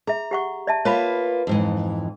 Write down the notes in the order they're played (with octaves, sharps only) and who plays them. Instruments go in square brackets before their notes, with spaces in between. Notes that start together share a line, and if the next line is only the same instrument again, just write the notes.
[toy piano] G#4 E5 [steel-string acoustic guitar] A#5
[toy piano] G4 F#5 C#6
D5 E5 A5
[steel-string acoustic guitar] A#3 F4 B4 [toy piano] C#5 F5 B5
[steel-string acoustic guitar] F2 G#2 E3